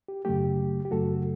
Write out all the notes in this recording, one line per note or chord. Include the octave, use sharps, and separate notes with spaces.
G4
F#2 C#3 F#3 A3 G4
G4
F#2 C#3 F#3 A3 F#4 A4